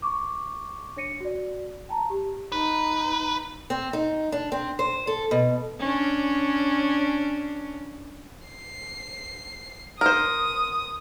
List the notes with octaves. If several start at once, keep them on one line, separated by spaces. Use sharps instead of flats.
C#6 D6
D4 C#5 A#6 C#7 D#7
F#4 D5
G5 A5 A#5
G4
D#4 B4
C4
D#4
D4
C4
C5
A4
B2
C#4 D4
C7
A#4 C5 D#6